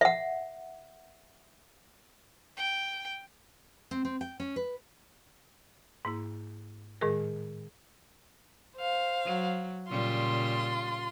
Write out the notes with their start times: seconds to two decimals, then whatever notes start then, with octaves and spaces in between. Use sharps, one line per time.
0.01 E5 F#5
2.57 G5
3.91 C4
4.05 C4
4.21 G5
4.40 C#4
4.56 B4
6.05 G#2 A#3 E4
7.01 A2 D#3 G#3 G#4 A#4
8.77 C5 F5
9.24 F#3
9.89 A#2 C#3 G3 F4 C6